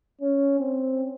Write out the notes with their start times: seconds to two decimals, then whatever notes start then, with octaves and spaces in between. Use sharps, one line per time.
0.21 C#4
0.60 C4